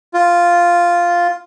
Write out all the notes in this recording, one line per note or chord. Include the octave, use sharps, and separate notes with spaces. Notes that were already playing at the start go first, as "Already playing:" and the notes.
F4